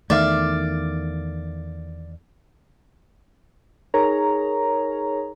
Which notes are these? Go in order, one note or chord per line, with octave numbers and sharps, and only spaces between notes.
E2 D#3 A3 D5 E5 F5
D#4 G#4 A#4 C#5 A#5